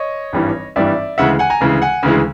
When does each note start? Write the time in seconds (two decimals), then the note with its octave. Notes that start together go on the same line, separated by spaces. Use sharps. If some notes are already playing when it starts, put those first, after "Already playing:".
Already playing: C#5 D#5
0.33 G#1 G2 E3 G3
0.76 G#1 G2 E3 G3 D5 E5
1.18 D2 C#3 E3 G#3 E5 F#5
1.39 F#5 G#5
1.50 G#5 A#5
1.61 D2 C#3 E3 G#3
1.82 F#5 G#5
2.03 D2 C#3 E3 G#3